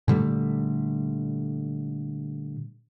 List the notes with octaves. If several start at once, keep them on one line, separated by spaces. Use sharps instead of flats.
A#2 D3 G3 A3